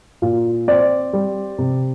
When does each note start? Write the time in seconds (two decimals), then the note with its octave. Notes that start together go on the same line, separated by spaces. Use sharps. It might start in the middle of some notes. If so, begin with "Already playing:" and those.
0.22 A#2
0.68 C4 D5
1.13 G3
1.58 C3